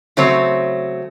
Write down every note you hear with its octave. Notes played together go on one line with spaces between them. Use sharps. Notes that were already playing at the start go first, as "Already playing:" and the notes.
C#3 F#3 A3 C4 C#5